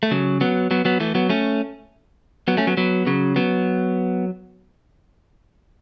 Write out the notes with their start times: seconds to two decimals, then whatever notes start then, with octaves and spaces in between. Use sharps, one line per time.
0.03 A3
0.11 C#3 F#3
0.41 F#3 B3
0.71 F#3 B3
0.85 F#3 B3
1.00 E3 A3
1.15 F#3 B3
1.30 A3 C#4
2.48 F#3 B3
2.57 A3 C#4
2.67 F#3 B3
2.77 F#3 B3
3.07 C#3 F#3
3.36 F#3 B3